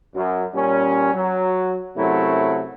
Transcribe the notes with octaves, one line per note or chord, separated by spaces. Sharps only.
F#2
A#2 G3 C#4
F#3
F#2 C3 F#3 A3 E4